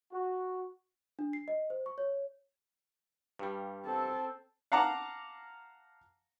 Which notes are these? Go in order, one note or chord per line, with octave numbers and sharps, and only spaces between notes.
F#4
D4
C7
D#5
C5
C#6
C#5
G2 G3
C4 A4
F5 F#5 A5 A#5 D6